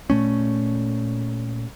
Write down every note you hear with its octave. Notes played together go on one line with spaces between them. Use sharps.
A#2 A3 C#4